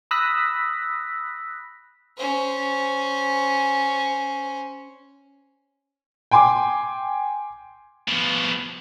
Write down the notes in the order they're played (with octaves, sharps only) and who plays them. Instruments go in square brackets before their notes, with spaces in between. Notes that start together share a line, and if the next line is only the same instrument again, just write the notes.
[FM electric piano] B5 D#6 E6 F#6 A#6 B6
[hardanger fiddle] C#4 C5
[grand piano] G5 G#5 C6 D6
[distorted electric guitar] B2 F3